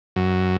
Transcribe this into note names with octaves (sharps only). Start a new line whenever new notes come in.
F#2